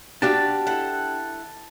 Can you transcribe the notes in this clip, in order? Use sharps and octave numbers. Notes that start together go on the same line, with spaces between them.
D4 F#4 G4 F5 A5
E4 A4 F#5